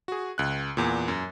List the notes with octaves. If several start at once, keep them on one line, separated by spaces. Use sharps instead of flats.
F#4 G#4
C#2 F#6
E2 A#2
F#2